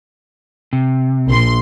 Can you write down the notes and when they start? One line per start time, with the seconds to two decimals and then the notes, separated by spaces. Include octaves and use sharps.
0.73 C3
1.28 A#1 C6